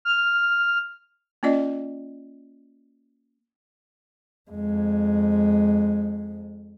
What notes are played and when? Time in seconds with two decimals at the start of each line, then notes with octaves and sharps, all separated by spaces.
0.05 F6
1.43 A#3 C#4 F4 D5 D#5
4.51 F2 G#3